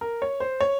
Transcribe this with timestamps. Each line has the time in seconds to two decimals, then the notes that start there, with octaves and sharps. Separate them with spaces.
0.01 A#4
0.22 C#5
0.40 C5
0.61 C#5